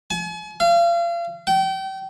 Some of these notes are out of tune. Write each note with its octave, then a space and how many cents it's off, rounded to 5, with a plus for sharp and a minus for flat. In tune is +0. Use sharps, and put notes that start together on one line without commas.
G#5 +40
F5 -35
G5 -30